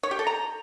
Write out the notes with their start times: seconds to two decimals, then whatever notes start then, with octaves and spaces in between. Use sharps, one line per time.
0.03 C#5
0.11 G4
0.19 A4
0.27 A#5